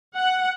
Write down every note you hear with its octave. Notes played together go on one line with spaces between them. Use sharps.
F#5